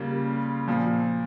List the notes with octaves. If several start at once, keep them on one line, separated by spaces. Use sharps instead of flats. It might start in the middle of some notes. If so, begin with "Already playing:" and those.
Already playing: C#3 G3 A#3 F4
A#2 F3